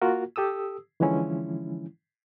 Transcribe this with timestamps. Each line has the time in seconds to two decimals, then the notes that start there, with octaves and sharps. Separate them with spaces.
0.02 A#3 F4 F#4 A#4
0.36 G4 A4 D#6 E6
1.00 D3 E3 F3 G#3 C#4 E4